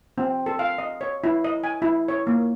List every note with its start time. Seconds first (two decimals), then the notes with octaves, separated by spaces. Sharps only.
0.18 C4
0.46 A4
0.59 F5
0.78 D#5
1.01 C#5
1.24 E4
1.44 D#5
1.64 G#5
1.82 E4
2.08 C#5
2.27 A#3